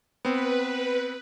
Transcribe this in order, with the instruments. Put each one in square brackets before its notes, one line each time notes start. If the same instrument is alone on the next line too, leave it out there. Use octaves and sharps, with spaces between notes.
[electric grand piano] B3 C4 [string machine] B4